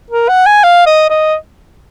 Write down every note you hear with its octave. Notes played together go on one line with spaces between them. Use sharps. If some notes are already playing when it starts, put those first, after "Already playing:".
A#4
F#5
G#5
F5
D#5
D#5